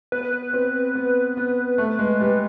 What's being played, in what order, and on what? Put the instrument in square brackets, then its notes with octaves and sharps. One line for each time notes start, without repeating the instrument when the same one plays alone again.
[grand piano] B3 [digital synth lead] B4
[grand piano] C4
B3
B3
A3
G#3
G3